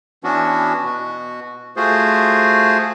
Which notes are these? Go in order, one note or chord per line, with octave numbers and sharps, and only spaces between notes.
E3 B3 C#4 D4 F#4
B2 F#4
A3 F4 F#4 G#4 C5